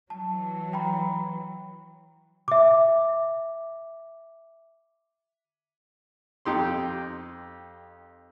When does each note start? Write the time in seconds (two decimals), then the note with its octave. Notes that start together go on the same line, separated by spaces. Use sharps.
0.10 E3 F#3 A5
0.73 G5 A#5 B5
2.48 E5 D6
6.45 F2 D#4 G4 C6